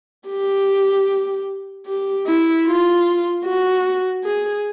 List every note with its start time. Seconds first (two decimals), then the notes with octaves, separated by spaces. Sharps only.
0.29 G4
1.87 G4
2.27 E4
2.67 F4
3.45 F#4
4.24 G#4